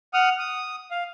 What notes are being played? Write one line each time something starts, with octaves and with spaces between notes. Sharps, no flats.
F#5 D#6 F6
D#6
F5